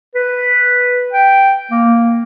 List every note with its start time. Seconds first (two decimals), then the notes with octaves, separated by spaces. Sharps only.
0.15 B4
1.13 G5
1.71 A#3